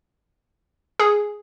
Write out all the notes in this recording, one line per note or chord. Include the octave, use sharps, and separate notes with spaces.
G#4